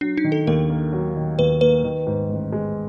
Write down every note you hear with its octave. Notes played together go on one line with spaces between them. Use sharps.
F#3 D4
D#4
D#3
A4
D#2 A#4
A#3
F#3
D#3
D#2 B4
A#3 B4
D#3
G#2
A1
G#3